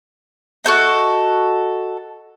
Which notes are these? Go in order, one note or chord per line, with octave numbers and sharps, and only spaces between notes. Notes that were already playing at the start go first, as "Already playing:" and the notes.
F#4 A4 C5 D#5